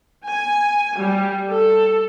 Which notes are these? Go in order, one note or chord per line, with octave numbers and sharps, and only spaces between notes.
G#5
G3
A4